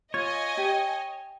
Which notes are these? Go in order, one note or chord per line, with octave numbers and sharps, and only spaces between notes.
F4 C#5 D#5 G#5
G4